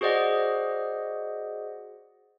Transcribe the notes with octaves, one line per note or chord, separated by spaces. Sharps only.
F#4 G#4 C5 D5 D#5 F#5